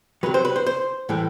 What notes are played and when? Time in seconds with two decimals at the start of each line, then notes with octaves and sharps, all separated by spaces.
0.23 C3 F#3 B4
0.34 C5
0.45 B4
0.56 C5
0.66 C5
1.09 A2 E3 G3